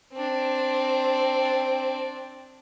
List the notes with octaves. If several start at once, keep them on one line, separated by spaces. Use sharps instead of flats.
C4 D4